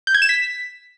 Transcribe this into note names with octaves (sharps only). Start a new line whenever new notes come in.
G6
G#6
E7
B6